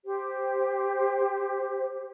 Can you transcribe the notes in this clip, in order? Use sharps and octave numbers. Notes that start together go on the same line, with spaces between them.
G4 C5